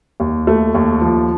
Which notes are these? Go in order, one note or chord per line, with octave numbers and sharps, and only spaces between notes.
D#2
A3
D#2
F3